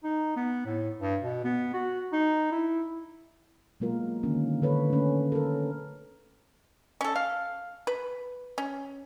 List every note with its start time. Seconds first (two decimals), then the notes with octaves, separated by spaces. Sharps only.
0.04 D#4
0.36 B3
0.66 A2
1.00 G2
1.20 B2
1.44 B3
1.74 F#4
2.12 D#4
2.52 E4
3.80 B2 F#3 G#3 A#3 F4 A#4
4.23 D3 D#3 A#3 C#4
4.62 D3 A4 B4 C#5
4.90 A3 C#4
5.32 A4 A#4
7.01 C#4 A4
7.16 F5
7.87 B4
8.58 C#4